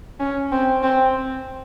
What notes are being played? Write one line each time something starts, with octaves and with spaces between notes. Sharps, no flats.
C#4
C4
C4